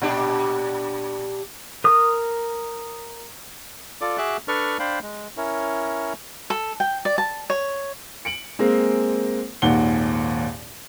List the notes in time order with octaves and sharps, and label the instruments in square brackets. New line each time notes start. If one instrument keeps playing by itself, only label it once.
[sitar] A#2 D4 G4
[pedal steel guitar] A#4 D#6
[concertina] F4 A4 D5 D6
F#4 G#4 E5 D6 F#6
D4 A4 B4 D5 C#6 F6
D4 C5 F5 G5 B5
G#3
C#4 E4 A#4 C#5
[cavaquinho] A4
G5
D5
A5
C#5
[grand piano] C#7 D7 F#7
G#3 A#3 C4
G#1 D#2 A#2 F#5 G7